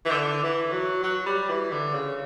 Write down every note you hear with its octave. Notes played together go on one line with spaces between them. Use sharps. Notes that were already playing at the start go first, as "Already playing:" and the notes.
E3
D3
E3
F#3
F#3
G3
E3
D3
C#3